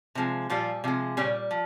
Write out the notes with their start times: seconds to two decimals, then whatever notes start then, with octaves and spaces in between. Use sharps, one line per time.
0.15 C3 F3 G#3
0.49 A#2 F3 G3 F4
0.84 C3 F3 G#3
1.17 A#2 C#3 G3 C#4
1.51 F3